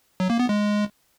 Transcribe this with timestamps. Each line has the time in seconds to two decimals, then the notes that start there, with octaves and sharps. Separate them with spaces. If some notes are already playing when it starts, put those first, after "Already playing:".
0.20 F#3
0.30 A#3
0.39 B3
0.49 G#3